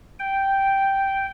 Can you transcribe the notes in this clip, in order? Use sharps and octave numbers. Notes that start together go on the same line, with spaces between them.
G5